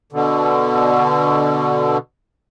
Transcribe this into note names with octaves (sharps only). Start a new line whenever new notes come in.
B2 D3